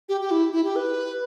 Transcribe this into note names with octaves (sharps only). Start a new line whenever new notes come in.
G4
G4
E4
E4
G4
B4